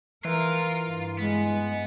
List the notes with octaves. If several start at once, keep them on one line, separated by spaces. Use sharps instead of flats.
E3 F4 A#4
G2
G#3 B3